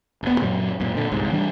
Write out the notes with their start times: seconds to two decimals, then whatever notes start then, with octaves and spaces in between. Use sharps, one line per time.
0.23 E1 B3
0.41 F#2 A#2 F#3
0.80 F#2 A#2
0.94 A#2 D3
1.11 G1 C2 G#2
1.32 E3 G3 D4